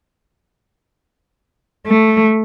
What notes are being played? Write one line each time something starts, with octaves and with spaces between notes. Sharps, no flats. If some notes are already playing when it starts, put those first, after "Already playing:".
A3